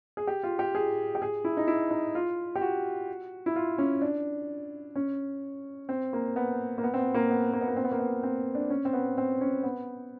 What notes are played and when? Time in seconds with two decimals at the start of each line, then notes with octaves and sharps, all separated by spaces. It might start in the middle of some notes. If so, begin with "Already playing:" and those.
0.17 G#4
0.27 G4
0.43 F4
0.59 G4
0.75 G#4
1.15 G4
1.22 G#4
1.44 E4
1.57 D#4
1.67 E4
1.91 D#4
2.15 F4
2.55 G4
2.61 F#4
3.46 E4
3.56 F4
3.78 C#4
4.02 D4
4.95 C#4
5.89 C4
6.13 A#3
6.36 B3
6.78 A#3
6.84 B3
6.94 C4
6.98 B3
7.14 A#3
7.30 B3
7.53 A#3
7.61 B3
7.67 A#3
7.77 C4
7.84 B3
7.92 A#3
7.99 B3
8.23 C4
8.55 D4
8.70 C#4
8.85 C4
8.93 B3
9.18 C4
9.41 C#4
9.63 B3